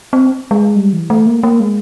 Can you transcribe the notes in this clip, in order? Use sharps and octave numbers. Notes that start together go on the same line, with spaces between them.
C4
G#3
G3
E3
A3
A#3
A#3
G#3